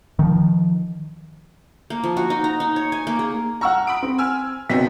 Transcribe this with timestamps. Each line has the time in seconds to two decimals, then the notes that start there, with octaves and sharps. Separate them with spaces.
0.19 D#3 F3
1.90 A#3
2.04 F3
2.17 F#4
2.30 D#4
2.44 A#5
2.60 D#4
2.76 C#5
2.92 G#5
3.07 A#3
3.19 G#4
3.61 F#5 A#5 C#6 E6 F6
3.87 B5 D#6 D7
4.03 C4
4.18 G#5 E6 F6
4.69 F#1 B2 B3 C4 D#4 B6